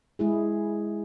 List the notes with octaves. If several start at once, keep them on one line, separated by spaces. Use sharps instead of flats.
G#3 E4 G#4